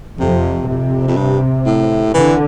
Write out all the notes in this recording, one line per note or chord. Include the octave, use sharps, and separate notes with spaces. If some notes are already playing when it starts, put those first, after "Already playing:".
F2 C3
F2 C3
F2
G2
A2
D3 E3